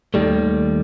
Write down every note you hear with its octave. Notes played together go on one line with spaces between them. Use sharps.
D#2 D#3 G3 A3